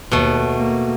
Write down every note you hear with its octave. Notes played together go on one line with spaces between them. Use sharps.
D#2 B2 A3
A#3